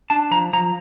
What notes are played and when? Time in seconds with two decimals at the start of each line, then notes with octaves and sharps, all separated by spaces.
0.10 D4 A5
0.31 F3 A#5
0.53 F3 A#5